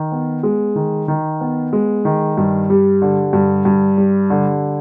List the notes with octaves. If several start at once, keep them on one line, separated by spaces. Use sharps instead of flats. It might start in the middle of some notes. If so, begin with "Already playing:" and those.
Already playing: D#3
B3
G#3
D#3
D#3
B3
G#3
D#3
G2
G3
D3
G2
G2
G3
D3